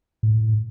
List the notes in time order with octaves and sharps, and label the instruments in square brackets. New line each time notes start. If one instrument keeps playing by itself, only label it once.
[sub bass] A2